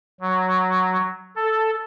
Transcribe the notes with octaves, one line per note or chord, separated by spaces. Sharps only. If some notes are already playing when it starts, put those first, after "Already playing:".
F#3
A4